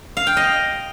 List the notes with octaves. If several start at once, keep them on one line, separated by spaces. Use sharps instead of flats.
F5
G5
D#5